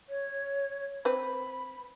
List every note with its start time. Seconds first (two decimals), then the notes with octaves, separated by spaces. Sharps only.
0.09 C#5
1.05 C4 B4 B5